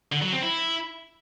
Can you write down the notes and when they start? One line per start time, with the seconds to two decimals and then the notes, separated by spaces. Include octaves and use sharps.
0.12 D3
0.22 F#3
0.32 C4
0.43 E4